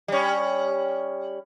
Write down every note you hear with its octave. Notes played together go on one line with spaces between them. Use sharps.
G3 C#4